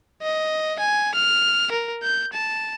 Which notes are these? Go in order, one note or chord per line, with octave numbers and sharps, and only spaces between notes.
D#5
G#5
F6
A#4
G6
A5